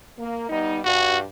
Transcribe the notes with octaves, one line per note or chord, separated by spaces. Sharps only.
A#3
G3 B3 D#4
G2 F#4